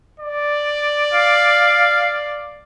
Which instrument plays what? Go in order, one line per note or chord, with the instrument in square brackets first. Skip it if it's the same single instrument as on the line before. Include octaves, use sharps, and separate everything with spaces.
[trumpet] D5
[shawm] F5